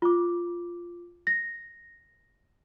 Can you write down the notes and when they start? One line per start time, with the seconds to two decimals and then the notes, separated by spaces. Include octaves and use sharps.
0.02 F4 D6
1.27 A#6